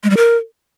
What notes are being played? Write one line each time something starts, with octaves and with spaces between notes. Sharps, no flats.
G#3
G3
A#4